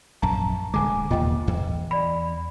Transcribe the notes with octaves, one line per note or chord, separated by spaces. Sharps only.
A#1 F#2 A5 A#5
D1 D3 G#3 G#5 D6
D#2 A#2 F4 D#5 G5
E2
D5 B5